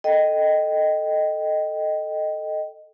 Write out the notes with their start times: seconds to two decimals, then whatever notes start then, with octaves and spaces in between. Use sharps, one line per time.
0.04 A4 D#5 G5